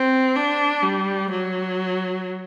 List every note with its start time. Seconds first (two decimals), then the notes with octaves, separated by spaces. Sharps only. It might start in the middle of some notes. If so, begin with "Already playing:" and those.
Already playing: C4
0.36 D4
0.83 G3
1.30 F#3